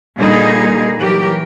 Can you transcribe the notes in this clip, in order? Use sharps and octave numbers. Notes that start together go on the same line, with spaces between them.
A#2 D3 G3 D#4 G#4
E3 F#3 G4 A#4